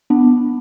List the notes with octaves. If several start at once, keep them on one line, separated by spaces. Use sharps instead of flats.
B3 D4